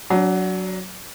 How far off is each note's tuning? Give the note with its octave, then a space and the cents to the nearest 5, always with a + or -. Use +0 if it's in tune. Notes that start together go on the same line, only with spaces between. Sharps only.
F#3 +5 D4 -30